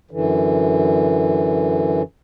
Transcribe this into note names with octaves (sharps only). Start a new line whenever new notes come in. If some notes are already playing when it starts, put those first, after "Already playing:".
F#2 D3 E3